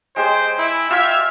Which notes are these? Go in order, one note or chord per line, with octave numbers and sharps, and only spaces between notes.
G#3 G4 C5 C#5 D7
E4
F4 G4 E5 F6 G#6